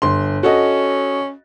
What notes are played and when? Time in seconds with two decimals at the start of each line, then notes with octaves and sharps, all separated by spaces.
0.02 G1 C6
0.43 C#4 F#4 A4 D#5